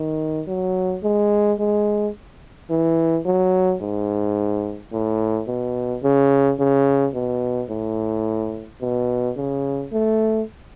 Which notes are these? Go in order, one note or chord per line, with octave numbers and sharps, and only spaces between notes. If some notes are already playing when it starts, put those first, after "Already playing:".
Already playing: D#3
F#3
G#3
G#3
E3
F#3
G#2
A2
B2
C#3
C#3
B2
A2
B2
C#3
A3